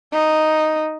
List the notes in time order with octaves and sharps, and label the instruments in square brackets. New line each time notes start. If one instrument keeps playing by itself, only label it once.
[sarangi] D#4